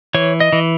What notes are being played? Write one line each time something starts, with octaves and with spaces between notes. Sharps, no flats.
E3 C#5
D#5
E3